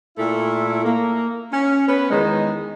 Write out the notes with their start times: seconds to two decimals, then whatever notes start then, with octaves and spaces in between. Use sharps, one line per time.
0.17 A#2 A3 E4
0.84 A#3
1.52 C#4
1.88 B3 C#4 B4
2.10 E2 D#3 G#3 D#4